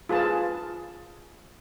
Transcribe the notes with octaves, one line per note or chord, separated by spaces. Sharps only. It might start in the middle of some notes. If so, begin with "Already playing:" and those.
F4 G#4 B4 A5